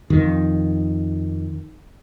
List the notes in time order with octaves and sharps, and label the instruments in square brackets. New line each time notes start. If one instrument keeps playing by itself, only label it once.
[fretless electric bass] F2 D#3